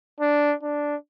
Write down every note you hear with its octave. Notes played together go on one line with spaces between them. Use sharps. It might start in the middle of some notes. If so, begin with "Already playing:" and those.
D4
D4